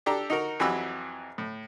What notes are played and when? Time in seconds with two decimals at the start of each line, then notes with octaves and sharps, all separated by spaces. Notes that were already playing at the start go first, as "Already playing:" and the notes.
0.06 D4 G4 A4 A#5
0.30 D#4 F#4 A#4
0.60 F2 E3 F#3 G4 B5 E6
1.38 A2